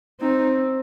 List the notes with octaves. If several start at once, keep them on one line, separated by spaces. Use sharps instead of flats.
C4 D#4